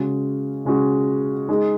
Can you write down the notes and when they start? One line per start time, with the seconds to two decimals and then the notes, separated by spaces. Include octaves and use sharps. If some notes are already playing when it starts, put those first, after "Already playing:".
Already playing: C#3 G#3 C#4 F#4
0.65 C#3 G#3 C#4 F#4
1.49 G#3 D#4 G#4